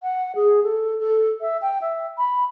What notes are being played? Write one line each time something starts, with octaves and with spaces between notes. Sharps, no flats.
F#5
G#4
A4
A4
E5
G5
E5
B5